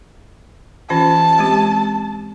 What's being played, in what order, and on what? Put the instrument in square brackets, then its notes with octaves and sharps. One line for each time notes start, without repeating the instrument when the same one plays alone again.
[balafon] E3 C#4 F4 [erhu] A5
[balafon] G#3 C4 G4